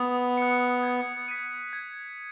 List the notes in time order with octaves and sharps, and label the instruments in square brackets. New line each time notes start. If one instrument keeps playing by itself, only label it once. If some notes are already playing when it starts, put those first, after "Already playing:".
Already playing: [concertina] B3 [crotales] D#6
[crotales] F#6 C#7
G#6
B6 D#7
G#6